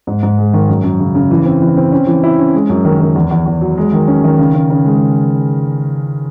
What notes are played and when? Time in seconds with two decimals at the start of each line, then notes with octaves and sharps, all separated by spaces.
0.07 G#2
0.23 G#2
0.38 G#3
0.53 D#3
0.69 F#2
0.84 F#2
1.00 C#3
1.15 C#3
1.31 E3
1.45 C4
1.62 E3
1.77 C4
1.92 C#4
2.07 E3
2.24 E4
2.39 C#4
2.54 G#3
2.69 F#2
2.85 D#3
3.01 D#3
3.16 E2
3.31 E2
3.46 E2
3.61 F#3
3.77 G#3
3.93 D#3
4.08 C#4
4.24 D#3
4.38 C#3
4.54 C#3
4.70 C#3
4.85 G#3